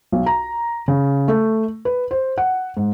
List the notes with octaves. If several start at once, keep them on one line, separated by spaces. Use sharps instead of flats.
B1
A#5
C#3
A3
B4
C5
F#5
G#2